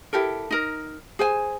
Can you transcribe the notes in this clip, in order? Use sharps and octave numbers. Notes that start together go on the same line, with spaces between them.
E4 G4 A4 A#4
D#4 A#4
G#4 C5 G#5